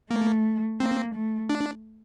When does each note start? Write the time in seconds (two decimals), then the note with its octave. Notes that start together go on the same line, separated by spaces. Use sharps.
0.11 A3 A#3
0.80 A#3 C4
1.15 A3
1.49 D4